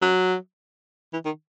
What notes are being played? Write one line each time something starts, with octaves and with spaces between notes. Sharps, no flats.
F#3
E3
D#3